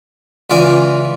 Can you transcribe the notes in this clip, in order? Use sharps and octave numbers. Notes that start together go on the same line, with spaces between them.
C#2 E3 F4 D5 G#5